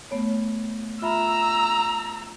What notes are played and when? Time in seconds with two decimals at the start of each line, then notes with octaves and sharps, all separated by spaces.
0.11 A3 B3 C#5
1.02 F4 E5 A#5 B5 E6